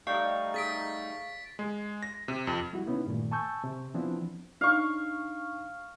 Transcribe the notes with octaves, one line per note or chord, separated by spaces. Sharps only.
G3 A3 D#4 G4 D5 D#5 F5 C#6
G#4 A6 B6 D7
G#3
A#6
C3
F2
G3 E4 F#4
C3 B3 C#4 D#4 E4
G2 A#2 D#3 A3
G#5 A5 C#6 E6 G6
C3
E3 F3 B3 C4 D4 E4
D4 D#4 F5 C#6